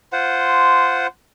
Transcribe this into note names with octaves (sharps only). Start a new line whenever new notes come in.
F4 C5 F#5